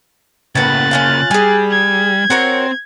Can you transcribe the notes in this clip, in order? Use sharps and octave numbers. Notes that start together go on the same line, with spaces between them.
A2 C#3 A#3 B3 F#6 A6
C#4 F4 F5
G3 G#4 G#5
G#6
C4 F#4 A#4 C#5